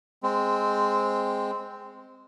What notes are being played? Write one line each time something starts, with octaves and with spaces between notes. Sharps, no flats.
G#3 C4